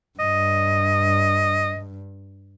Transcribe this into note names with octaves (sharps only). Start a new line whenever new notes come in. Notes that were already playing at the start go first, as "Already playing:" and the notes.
G2 D#5